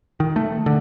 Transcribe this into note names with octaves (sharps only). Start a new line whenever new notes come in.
D#3
A3
D3